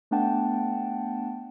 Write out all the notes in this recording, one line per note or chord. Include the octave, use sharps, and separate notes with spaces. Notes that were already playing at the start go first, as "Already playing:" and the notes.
A3 B3 D4 F#5 G5 A5